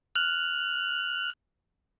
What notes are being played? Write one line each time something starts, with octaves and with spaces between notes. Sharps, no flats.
F6 F#6